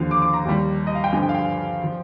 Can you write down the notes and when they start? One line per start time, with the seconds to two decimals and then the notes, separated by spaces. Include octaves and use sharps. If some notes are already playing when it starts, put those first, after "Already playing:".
Already playing: D#2 D3 F3 F5
0.11 D6
0.22 D6
0.33 A#5
0.45 D#2 D#3 G3
0.87 D#5
0.95 F5
1.04 G5
1.12 G2 D3 F3 G#5
1.23 G5
1.29 F5
1.34 G5
1.84 F3